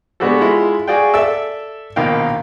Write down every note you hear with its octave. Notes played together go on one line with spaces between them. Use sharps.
G#3 B3 D4 F#4 G4 A4
G#3 E4 F4
F#4 G#4 D5 F5 G5
A4 D5 E5 E6
A#1 B2 D#3 A#3 F5 G5